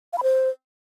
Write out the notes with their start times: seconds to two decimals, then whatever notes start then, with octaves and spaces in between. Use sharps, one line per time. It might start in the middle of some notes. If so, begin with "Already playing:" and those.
0.13 F5
0.18 B5
0.23 C5